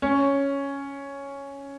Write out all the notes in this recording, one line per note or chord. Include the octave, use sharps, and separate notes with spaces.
C#4